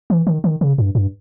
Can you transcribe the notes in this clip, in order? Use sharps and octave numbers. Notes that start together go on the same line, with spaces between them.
E3
D#3
D#3
C#3
G2
G2